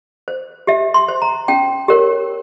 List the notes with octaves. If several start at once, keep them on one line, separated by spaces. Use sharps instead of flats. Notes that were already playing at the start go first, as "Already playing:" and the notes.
C5
G4 E5
C6
C5
A#5
C#4 G5
G4 A#4 C#5